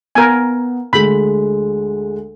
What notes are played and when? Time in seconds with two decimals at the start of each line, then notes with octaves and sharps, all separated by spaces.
0.15 B3 A#4 G#5
0.93 D2 G#3 B5